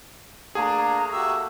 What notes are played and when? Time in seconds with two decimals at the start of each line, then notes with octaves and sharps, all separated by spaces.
0.55 A3 A#3 D4 G#4 A#5
1.12 F#4 G4 E5